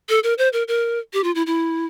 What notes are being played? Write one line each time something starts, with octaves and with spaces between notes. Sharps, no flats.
A4
A#4
C5
A#4
A#4
G4
F4
E4
E4